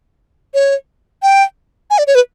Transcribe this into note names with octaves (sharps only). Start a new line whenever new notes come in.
C#5
G5
G#5
D5
C#5
B4